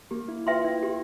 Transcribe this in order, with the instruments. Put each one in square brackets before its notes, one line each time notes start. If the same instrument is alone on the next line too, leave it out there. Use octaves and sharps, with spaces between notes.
[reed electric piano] A#3 [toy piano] G4
[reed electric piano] E4
[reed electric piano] F4 [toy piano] B4 E5 G5 C6
[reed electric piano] E4
[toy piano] G4